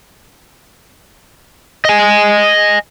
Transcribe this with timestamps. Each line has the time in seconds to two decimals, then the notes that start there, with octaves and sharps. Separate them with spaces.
1.85 D#5 G#5